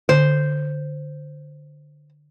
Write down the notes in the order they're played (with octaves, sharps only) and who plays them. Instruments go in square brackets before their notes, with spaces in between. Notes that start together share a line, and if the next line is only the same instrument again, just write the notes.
[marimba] D3 [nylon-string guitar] C5